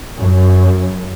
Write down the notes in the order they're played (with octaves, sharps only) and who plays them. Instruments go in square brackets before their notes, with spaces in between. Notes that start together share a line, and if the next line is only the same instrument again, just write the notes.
[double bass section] F#2